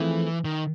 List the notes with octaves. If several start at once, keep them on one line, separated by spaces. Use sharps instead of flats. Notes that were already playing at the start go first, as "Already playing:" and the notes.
Already playing: E3 F3 A3 C4 E4 G#4
D#3